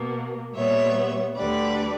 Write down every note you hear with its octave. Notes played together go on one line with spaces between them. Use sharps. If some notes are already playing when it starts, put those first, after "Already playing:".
Already playing: B2 A#3
A#2 G3 B3 C#5 E5
D2 D3 G3 B4 D5